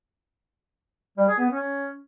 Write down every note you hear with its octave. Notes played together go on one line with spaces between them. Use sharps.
G3
G#4
B3
C#4